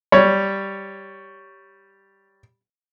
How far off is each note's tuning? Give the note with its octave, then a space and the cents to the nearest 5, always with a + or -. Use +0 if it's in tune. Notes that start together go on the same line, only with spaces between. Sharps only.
G3 +0 C#5 +10